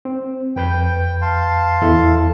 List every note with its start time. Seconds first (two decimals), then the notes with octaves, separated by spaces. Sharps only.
0.05 C4
0.56 F2 B4 G5 G6
1.22 F5 A5 C6
1.82 E2 E4 A4